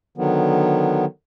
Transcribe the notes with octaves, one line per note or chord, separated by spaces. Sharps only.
D3 D#3 F#3 B3